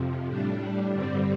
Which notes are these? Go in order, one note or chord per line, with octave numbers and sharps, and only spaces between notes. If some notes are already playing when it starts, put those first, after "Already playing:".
Already playing: F2 C3 F3
A2 G3 D4
G2 D3 G3 C4